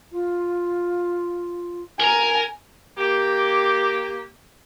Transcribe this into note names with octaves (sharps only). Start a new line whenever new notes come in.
F4
A#4 G#5 A#5
A#3 G4